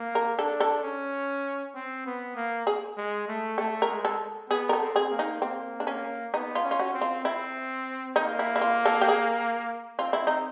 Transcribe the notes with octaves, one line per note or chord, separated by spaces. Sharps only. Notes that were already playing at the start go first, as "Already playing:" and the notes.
Already playing: A#3
A#4
D4 A4
A4
C#4
C4
B3
A#3
G#4
G#3
A3
A3 A4
A#4
G#3
A4
B3 G#4
A#4
A4
C4
G#4
A#3
D#4
A#3 C4
D4
A#3 C#4
B3 D#4
F4
C#4
F4
F#4
C4
F4
C4 E4
A#3 D#4
E4
E4
F4
A4
G4
G#4
C4 F4
E4
D#4